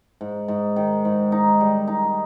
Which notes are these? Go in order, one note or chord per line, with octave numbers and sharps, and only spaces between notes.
G#2
G#2
D#3
G#2
D#4
G3
D#4